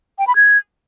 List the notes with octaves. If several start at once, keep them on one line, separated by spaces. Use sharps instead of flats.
G5
B5
G#6